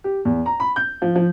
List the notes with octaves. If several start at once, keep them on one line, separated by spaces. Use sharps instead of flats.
G4
E2
A#5
B5
G6
F3
F3